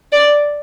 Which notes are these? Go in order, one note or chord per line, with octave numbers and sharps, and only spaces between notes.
D5